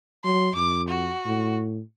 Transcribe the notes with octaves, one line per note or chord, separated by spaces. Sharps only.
F#3 C6
F2 D6
F#4
A2